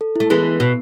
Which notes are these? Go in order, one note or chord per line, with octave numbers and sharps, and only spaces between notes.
A4
A3 E4
E3 G#3 B3
B3
B2 B3